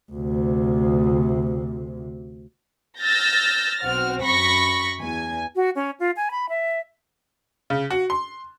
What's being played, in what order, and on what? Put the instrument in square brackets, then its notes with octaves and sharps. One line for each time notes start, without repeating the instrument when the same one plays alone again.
[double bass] D2 C3
[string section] E6 F6 G6 A6 A#6
B1 C4 F#4 F6
F#2 B5 C#6 A#6
E2 G#5
[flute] F#4
C#4
F4
G#5
B5
E5
[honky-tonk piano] C#3
F#4
C6